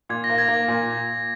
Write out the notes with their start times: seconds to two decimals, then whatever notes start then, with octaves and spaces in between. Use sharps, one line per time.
0.09 A#2 G#6
0.24 A#6
0.29 A#3
0.38 G#6
0.48 A#3
0.68 A#2